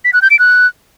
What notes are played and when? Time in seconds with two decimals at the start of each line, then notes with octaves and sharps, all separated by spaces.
0.04 B6
0.13 F#6
0.22 G6
0.30 D7
0.39 F#6